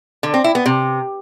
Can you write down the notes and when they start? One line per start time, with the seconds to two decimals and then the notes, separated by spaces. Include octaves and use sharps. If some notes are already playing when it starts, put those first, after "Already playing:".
0.23 D3
0.34 C4
0.44 E4
0.55 B3
0.66 C3